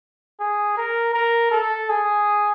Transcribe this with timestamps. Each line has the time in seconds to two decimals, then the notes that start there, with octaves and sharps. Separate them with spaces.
0.40 G#4
0.77 A#4
1.14 A#4
1.51 A4
1.90 G#4